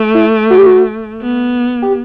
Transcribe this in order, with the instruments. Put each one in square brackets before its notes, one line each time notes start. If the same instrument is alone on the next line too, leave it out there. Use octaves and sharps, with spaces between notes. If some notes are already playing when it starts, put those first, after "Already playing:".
Already playing: [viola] A3
[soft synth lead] E4
F#4
G4
F#4
[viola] B3
[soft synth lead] G4